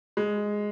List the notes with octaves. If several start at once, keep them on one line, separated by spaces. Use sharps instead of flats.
G#3